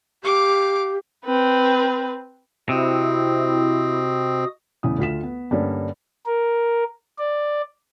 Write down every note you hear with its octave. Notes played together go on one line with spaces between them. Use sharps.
G4 F5 D6
C4 B4
C3 C4 E4 F#4 D#5 D#6
E2 C#3 E4 D#6
D2 F4 B6 E7
B3
G2 D3 G3 A#3 C#4
A#4
D5